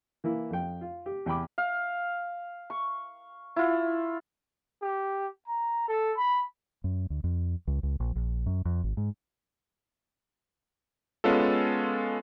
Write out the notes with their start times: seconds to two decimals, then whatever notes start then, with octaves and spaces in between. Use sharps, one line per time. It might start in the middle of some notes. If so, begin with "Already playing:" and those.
0.24 E3 A#3 E4
0.50 F2 G5
0.81 F4
1.06 G4
1.26 E2 G5 B5 D6
1.58 F5
2.70 C#6
3.56 E4 F4
4.82 G4
5.48 A#5
5.88 A4
6.18 B5
6.84 F#2
7.10 D2
7.24 F2
7.67 C#2
7.83 C#2
8.00 A#1
8.15 A#1
8.46 F#2
8.65 F2
8.84 G#1
8.97 G#2
11.24 G#3 B3 C#4 F4 A4